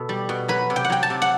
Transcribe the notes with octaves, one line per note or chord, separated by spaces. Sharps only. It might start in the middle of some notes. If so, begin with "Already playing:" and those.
Already playing: B2 A4
G3
B2
F#3 B4
C3
G5
F#5
F#3 G5
A5
C3
F#5